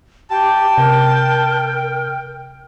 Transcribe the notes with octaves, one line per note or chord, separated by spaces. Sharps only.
G4 G5 A5
C3 A#4